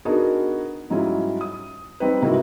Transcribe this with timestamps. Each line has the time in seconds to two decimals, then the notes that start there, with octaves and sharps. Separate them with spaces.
0.05 B3 D4 D#4 F#4 G#4 A#4
0.90 G#2 F#3 G3 C#4 E4 F4
1.41 D#6
2.00 G3 C4 D#4 B4
2.22 G#2 C3 A#3 D#4 E4 F#4